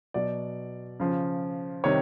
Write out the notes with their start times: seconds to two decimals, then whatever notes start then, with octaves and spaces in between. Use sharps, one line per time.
0.14 B2 F#3 D5
1.00 C#3 F3
1.84 C3 D#3 G3 C#5